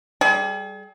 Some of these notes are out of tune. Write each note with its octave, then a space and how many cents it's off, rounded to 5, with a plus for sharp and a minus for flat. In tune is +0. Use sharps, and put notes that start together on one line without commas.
G3 +0 G#4 +40